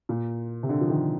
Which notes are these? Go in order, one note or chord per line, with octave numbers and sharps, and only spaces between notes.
A#2
C3
D3
F3
D#3